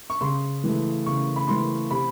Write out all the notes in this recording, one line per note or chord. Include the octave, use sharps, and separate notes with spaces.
C#6
C#3 C6
E3 A3
C#3 C#6
B5
E3 A3 C6
C3 B5